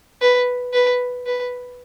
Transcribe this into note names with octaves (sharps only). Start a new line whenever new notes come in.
B4
B4
B4